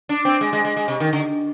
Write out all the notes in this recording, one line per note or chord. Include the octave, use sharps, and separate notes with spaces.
D4
C4
G#3
G#3
G#3
G#3
C3
D#3
D3